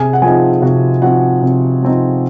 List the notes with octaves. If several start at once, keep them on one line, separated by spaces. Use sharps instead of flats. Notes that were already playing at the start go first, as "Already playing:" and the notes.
Already playing: C3 G#4 G#5
F#5
F3 C4 D#4 G#4 G#5
C3 F#4 F#5
F3 C4 D#4 F#4 F#5
C3
F3 C4 D#4